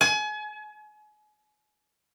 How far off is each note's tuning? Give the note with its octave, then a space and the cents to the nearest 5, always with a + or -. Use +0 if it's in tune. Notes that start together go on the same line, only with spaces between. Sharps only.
G#5 +35